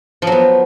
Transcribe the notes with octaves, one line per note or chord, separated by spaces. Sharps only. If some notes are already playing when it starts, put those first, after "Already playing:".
F3 F#3 B3